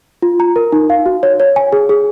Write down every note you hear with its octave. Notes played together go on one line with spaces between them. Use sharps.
F4
A#5
A#4
D#4
F5
F#4
C#5
C#5
G#5
G#4
G#4